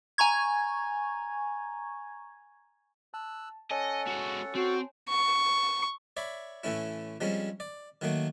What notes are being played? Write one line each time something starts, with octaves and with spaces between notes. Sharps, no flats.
G#5 A#5 C#6 G#6
A5 E6 F#6
C#4 A4 C#5 D#5 F#5 G#5 A5
G#3 F#4
C4 F#4
C#6
C#5 D5 E5 B5
A2 E3 A3 C#4 E4
F3 G3 G#3 C4 C#4
D5
D#3 F#3 A3 A#3